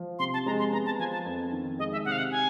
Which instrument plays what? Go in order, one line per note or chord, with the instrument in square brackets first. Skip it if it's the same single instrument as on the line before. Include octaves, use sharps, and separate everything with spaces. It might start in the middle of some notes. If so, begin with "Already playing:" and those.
Already playing: [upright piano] F3
[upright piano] C3 [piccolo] C6
[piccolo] A5
[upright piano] G#3 [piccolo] A#5
[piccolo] C6
[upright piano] B3 [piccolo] A#5
[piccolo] A5
[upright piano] F3 [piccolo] G#5
[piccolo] A5
[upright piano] F2
D#3
[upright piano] G#3 [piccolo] D#5
[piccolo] E5
[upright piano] C3 [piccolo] F#5
[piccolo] F5
F#5
G#5